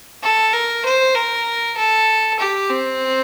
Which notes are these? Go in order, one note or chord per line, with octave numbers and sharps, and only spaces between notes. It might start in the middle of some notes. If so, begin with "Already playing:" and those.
A4
A#4
C5
A#4
A4
G4
C4